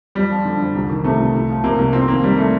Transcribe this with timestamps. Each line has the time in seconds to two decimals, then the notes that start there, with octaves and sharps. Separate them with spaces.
0.15 F2 G3
0.30 F3
0.45 D3
0.60 F2
0.75 C2
0.90 D#3
1.04 C3 A3
1.19 C2
1.35 C2
1.49 F3
1.64 C3 A#3
1.79 C2
1.93 F2 C4
2.08 D#3 A#3
2.23 C3 G3
2.38 A3